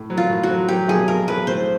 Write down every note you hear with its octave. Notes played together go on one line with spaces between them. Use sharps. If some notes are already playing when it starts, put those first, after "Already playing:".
Already playing: A2
F#3
F4
A2
F#4
F#3
F#3 G4
B1 G#4
B1 A#4
B1 B4
A2 C5